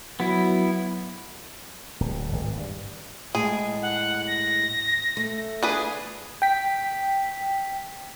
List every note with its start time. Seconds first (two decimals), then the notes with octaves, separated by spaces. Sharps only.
0.20 F#3 B3 E4
2.00 D1
2.33 G#1
2.56 G2
3.35 A2 G#3 G#4
3.82 F#5
4.27 A#6
5.17 A3
5.63 D4 G#4 B4 D#6
6.42 G5 B6